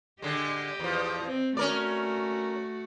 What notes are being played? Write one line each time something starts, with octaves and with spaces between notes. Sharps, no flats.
D3 G#3 G4 D#5
E2 F3
C4
A3 C#4 F#4 A#4 D5